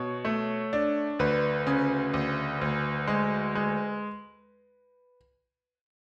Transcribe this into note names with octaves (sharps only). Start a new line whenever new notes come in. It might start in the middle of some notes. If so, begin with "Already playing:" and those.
Already playing: B2 C#5
A3
D4
D2 B4
C#3
D2
D2
G#3
G#3